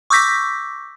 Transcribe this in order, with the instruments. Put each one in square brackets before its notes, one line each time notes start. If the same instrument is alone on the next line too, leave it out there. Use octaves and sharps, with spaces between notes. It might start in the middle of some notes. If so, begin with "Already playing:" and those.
[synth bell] C#6 D6 E6 G6 A#6 B6